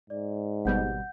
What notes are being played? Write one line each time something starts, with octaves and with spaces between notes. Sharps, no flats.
G#2 D5
G#1 B2 G3 F#5 G6